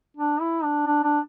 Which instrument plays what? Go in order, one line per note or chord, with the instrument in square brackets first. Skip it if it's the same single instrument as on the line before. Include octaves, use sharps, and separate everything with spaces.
[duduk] D4
E4
D4
D4
D4